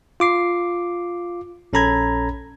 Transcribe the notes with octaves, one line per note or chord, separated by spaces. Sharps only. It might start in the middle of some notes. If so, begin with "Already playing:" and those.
F4 D6 C7
A#1 C#4 A4 A#5 B5 G#6